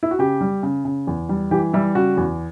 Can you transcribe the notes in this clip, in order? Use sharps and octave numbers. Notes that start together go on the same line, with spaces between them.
E4
F#4
C#3 G4
G3
C#3
C#3
E2
G3
E3 G4
G3 E4
C#3 F#4
E2